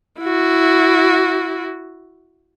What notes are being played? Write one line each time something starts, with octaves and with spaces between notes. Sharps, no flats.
E4 F#4